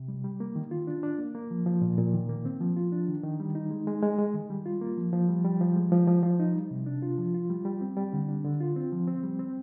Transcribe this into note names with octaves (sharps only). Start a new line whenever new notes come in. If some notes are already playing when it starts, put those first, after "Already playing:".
Already playing: C3
G3
G3
A#3
D#3
F4
D4
D4
A#3
A#3
F3
F3
A#2
A#2
D#3
A#3
C4
F3
F4
D4
D#3
D#3
G3
D#4
G#3
G#3
G#3
G#3
D#3
G3
F4
A#3
F3
F3
G3
G3
F3
G#3
F3
F3
F3
D#4
G3
C3
D4
F4
F3
F4
G3
G3
C4
G3
D3
D4
D3
F4
C4
F3
C4
G3
C4